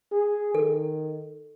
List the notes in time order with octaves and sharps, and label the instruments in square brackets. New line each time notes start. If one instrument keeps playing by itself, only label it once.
[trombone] G#4
[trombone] D#3 [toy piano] A4